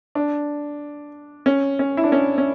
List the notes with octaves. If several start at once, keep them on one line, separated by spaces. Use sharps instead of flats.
D4
C#4
C#4
E4
D4
C#4
C#4